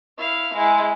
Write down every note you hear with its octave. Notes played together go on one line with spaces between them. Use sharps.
E4 F5
G#3 E4